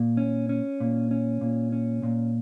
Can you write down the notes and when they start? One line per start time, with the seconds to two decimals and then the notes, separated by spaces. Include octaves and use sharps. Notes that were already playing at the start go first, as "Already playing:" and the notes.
Already playing: A#2
0.17 C#4
0.49 C#4
0.80 A#2
1.11 C#4
1.41 A#2
1.72 C#4
2.03 A#2